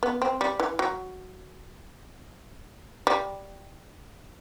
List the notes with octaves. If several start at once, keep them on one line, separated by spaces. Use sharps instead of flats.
B3
C4
G3
E3
F#3
G3